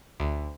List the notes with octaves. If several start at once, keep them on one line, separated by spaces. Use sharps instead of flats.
D2